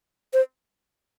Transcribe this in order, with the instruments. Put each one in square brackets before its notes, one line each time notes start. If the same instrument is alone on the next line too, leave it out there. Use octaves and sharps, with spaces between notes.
[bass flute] C5